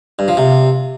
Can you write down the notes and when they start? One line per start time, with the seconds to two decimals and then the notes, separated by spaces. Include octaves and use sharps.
0.19 G2
0.28 F3
0.37 C3